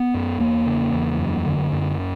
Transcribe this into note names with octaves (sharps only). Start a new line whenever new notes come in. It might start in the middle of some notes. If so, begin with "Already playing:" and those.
Already playing: B3
F#2
E2 A#3
C#3
E2
F#2
D3
F#2